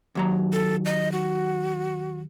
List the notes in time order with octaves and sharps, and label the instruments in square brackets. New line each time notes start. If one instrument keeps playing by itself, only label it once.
[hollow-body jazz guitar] D#2 F#3 A#5
[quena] A4
D#5
F#4